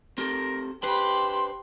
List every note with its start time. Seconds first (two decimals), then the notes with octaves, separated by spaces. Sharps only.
0.18 C4 G4 A4 A#4
0.83 D4 G4 B4 C5 B5 C6